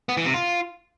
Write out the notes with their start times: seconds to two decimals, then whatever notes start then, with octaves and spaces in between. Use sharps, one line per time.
0.09 B3
0.17 E3
0.26 C3
0.34 F4